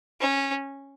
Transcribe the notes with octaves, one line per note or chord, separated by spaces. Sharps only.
C#4